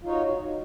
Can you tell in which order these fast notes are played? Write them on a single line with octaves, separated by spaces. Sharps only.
F4 D#4 C#5 F#4